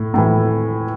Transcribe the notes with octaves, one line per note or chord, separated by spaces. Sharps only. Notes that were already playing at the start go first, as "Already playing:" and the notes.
Already playing: A2
A2 E3